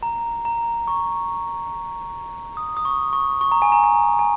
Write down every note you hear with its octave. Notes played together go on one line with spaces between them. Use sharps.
A#5
A#5
C#6
D#6
D#6
C#6
C#6
C#6
A#5
G#5
A#5
G#5
G#5